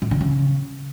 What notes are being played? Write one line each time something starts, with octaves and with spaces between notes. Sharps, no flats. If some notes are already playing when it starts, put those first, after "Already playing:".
A2
D3
C#3